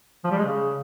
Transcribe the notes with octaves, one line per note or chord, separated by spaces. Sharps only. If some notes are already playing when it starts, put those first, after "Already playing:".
F3
G3
G#3
C#3